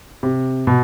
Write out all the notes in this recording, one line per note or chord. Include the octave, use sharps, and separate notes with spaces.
C3
B2